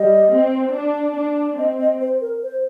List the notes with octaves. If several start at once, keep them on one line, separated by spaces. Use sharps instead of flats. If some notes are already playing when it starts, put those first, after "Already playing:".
Already playing: G3 D#5
C4
D4
D4
C4 D#5
D#5
C5
A#4
C5